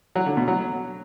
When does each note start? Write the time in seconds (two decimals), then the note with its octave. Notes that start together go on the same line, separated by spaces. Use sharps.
0.16 F#3
0.26 D3
0.37 B2
0.48 F#3